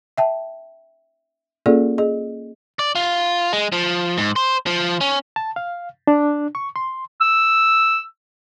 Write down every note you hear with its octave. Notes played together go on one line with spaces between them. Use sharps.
E5 G5 A5
A#3 C#4 F4 G#4 A4 D5
G#4 D#5
D5
F4
G#3
F3
G#2
C5
F3
C#4
A5
F5
D4
C#6
C6
E6